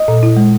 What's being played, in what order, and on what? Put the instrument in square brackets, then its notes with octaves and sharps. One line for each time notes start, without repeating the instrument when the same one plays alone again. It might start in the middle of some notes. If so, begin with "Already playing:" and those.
Already playing: [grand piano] D#5
[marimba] A#2
E4
G#3